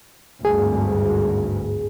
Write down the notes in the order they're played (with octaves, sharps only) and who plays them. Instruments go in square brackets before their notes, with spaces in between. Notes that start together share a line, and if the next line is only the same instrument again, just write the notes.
[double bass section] G#1 D2 G2 [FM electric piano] G#4